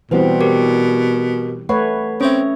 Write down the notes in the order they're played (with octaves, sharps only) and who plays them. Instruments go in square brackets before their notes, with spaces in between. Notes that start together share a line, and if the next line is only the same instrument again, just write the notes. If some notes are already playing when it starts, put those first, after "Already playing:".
[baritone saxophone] B2 [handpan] E3 G3 C4 [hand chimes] B4 C5 F#5
[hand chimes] G4 A#4 D6
[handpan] A3 B4 C#5 [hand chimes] F#5
[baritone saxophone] C4 [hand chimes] C#4 E5 [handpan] C#5